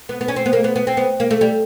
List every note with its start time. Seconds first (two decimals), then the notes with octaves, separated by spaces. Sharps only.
0.09 B3
0.21 B3
0.28 C#4
0.36 C4
0.46 B3
0.53 A#3
0.64 B3
0.76 B3
0.87 C4
0.97 B3
1.20 A#3
1.31 A3
1.41 G3